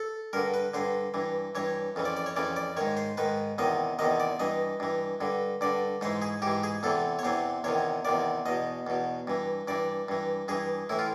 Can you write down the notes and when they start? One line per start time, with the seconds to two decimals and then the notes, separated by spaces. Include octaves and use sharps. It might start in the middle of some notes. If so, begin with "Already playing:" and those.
Already playing: A4
0.33 G2 D3 A#4
0.54 B4
0.74 G2 D3 C5
1.14 G2 E3
1.55 G2 E3 C#5
1.96 F2 C#3 E3
2.05 D5
2.17 D5
2.26 C#5
2.36 F2 C#3 E3 D5
2.56 D5
2.77 G#2 D#3 C#5
2.97 C5
3.17 G#2 D#3 B4
3.58 E2 C3 D#3 D#5
3.99 E2 C3 D#3 D#5
4.20 D5
4.40 G2 E3 D#5
4.80 G2 E3
5.21 G2 D3
5.61 G2 D3 D5
6.01 G#2 E3 C5
6.22 G#4
6.42 G#2 G4
6.47 E3
6.63 G#4
6.83 E2 C3 E3 A4
7.19 C#5
7.23 E2 C3 E3 C5
7.64 E2 C3 D#3 C#5
8.05 E2 C3 D#3 D5
8.46 E2 B2 D#5
8.87 E2 B2
9.27 G2 E3
9.68 G2 E3 D5
10.09 G2 E3
10.48 G2 E3 G#4
10.90 A2 E3 E4
10.99 F4